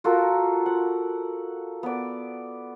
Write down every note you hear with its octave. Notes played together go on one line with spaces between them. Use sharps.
F4 F#4 A4 A#4
F#5
B3 D5